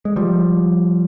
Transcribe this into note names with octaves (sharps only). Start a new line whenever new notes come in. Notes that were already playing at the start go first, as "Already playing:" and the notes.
G#3
F3 G3